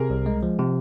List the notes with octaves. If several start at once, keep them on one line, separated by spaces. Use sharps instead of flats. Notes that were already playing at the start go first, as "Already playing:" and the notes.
Already playing: C3 G#4 A#4
C2
G#3
F3
C3